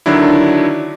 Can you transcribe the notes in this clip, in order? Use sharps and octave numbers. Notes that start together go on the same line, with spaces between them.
D3 D#3 F#3 D4 E4